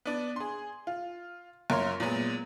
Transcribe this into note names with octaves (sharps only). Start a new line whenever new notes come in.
B3 D4
G#4 C6
F4
F#2 F4 A#4 C#5 C6
A#2 F#3 G#3 B3